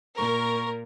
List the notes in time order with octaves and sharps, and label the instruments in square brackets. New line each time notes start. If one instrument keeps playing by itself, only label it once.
[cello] A#2 [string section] A#4 [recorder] C#6